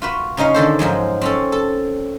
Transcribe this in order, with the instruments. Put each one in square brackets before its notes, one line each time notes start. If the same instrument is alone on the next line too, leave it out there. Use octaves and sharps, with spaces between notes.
[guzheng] F4 F#4 B4
C#3 C#4 D#4 D#5 F5
D3 D#3 A4 C5
G#2 F3 F#3 G#3
C4 C#4 A4
A4